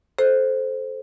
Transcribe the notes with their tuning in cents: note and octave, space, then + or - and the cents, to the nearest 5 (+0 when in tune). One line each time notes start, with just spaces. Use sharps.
A4 -20 C5 +0